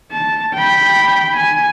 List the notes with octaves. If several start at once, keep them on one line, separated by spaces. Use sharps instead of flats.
A5
G5 B5
G#5